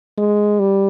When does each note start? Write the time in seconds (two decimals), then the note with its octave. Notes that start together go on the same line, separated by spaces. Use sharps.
0.18 G#3
0.60 G3